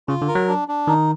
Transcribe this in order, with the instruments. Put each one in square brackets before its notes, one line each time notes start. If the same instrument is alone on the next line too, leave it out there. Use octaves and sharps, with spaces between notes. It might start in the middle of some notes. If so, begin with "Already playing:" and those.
[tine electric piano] C#3 [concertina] F4
[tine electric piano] D3
[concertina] A#4
[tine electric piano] F#3
[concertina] D4
D4
[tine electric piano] D#3 [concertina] D#4